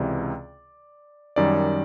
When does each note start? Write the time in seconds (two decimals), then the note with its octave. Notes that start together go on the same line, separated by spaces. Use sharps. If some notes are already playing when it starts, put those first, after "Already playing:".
Already playing: C#2 C3 E3 D5
1.36 F#2 D#3 G3 D5